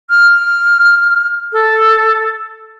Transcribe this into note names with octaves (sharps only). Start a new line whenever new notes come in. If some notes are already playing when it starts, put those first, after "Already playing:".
F6
A4